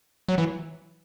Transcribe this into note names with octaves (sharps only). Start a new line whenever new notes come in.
F#3
E3